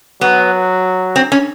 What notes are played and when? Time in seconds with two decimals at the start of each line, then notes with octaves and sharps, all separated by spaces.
0.21 F#3 B3
1.16 C4
1.32 C#4